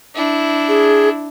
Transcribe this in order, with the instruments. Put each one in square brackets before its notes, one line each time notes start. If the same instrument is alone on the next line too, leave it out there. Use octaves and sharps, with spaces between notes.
[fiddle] D4 E4
[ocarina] G#4